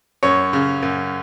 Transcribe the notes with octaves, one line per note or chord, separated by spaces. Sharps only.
F#2 C#5
C#3
F#2